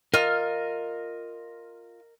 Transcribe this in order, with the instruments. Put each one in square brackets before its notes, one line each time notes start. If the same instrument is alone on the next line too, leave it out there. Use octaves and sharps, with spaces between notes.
[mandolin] F4 F6 [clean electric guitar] A#4 D#5